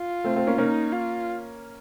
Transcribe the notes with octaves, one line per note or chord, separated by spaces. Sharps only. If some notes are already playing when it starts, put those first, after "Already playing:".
Already playing: F4
A3 C4
A3 C4
A#3 C#4
A#3 C#4 D#4
F4